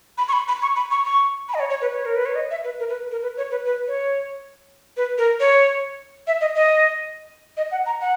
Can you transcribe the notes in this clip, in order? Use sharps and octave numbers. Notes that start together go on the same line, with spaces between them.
B5
C#6
B5
B5
C#6
B5
C#6
C#6
B5
D#5
C#5
C#5
B4
C#5
A#4
B4
C#5
D#5
E5
B4
A#4
B4
A#4
B4
C#5
B4
B4
C#5
B4
A#4
C#5
E5
D#5
D#5
D#5
F#5
A#5
F#5